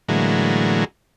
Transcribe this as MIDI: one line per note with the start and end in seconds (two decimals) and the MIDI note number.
0.09 0.85 45
0.09 0.85 50
0.09 0.85 52
0.09 0.85 54
0.09 0.85 56
0.09 0.85 58